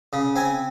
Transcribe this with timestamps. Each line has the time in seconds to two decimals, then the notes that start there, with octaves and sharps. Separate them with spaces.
0.13 C#3
0.36 C4 G#5